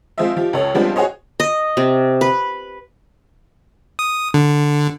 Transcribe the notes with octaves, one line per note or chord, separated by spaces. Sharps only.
F3 G#3 C4 F4 D#5 E5
F3 G4
C#2 A4 C#5
F3 G3 G#3 B3 C4 D4
F#4 G#4 C5 C#5 D#5
D#5
C3
B4
D#6
D3